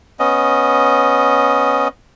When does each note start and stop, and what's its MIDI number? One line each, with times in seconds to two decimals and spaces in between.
0.19 1.88 59
0.19 1.88 61
0.19 1.88 75